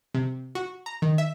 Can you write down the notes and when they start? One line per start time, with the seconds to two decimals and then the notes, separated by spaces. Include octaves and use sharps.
0.14 C3
0.55 F#4
0.86 A#5
1.02 D#3
1.18 E5